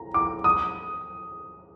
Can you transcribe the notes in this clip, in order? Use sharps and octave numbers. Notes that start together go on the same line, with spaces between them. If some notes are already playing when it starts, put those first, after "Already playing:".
Already playing: A#5
D6
D#6